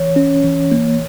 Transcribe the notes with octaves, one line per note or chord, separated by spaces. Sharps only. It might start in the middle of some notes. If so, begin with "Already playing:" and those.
Already playing: E3 C#5
C#4
E3
A#3